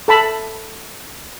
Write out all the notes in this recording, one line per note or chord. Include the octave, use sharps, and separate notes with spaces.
A4 A5 B5